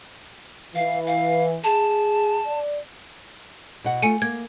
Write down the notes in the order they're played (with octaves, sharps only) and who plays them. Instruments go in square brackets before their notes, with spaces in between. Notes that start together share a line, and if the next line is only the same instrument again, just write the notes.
[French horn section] E3 [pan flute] F5
[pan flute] F5
[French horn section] G#4 [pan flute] A5
[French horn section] D5
[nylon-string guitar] B2 F#5
[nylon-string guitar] A3 F4 [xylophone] G#5 C#7 D#7
[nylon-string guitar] A#3 [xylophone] G#6